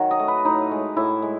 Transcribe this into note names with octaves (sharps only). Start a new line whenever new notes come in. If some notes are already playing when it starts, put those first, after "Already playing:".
Already playing: D#3 F#3 F#5
D#5
A3
B4
A2 D#4
G#3
A2 E4
G#3